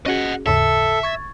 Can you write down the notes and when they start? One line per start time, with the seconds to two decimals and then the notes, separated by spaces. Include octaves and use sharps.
0.06 C#4 F#4 G#4 D#5 F#5
0.46 D#2 G#2 C#3 A4 E5
1.03 C#6 G#6 A6